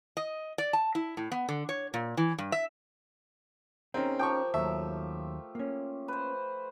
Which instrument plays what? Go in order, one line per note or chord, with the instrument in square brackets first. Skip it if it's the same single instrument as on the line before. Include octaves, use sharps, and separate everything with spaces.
[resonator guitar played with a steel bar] D#5
D5
A5
E4
A2
B3
D3
C#5
A#2
E3
G2
E5
[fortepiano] C4 [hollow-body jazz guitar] C#4 D#4 G#4 [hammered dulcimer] A#4 A#5
[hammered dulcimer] F3 G4 [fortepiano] G5 C#6
[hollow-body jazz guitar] D#2 F#3 [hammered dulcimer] A3 [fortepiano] E5
[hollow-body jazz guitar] A#3 C#4
[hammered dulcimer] B4 C5